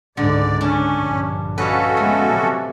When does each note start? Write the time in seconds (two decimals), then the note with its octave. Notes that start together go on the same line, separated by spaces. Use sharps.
0.17 C#2 G#2 D3 D5
0.61 C#4 D4
0.93 A#1 G2
1.58 C#4 F#4 A4 B4 D#5 F5
1.97 G#3 A3 B3
2.28 C3 F#3